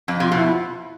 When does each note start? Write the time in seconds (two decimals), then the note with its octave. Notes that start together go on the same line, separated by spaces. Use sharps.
0.08 F2
0.20 C3 F4
0.32 B2
0.38 E4